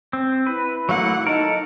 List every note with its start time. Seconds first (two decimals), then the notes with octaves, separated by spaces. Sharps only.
0.13 C4
0.47 E4 B4
0.89 F#3 A3 A#3 F#5
1.27 D#4 A4 A#4 D#5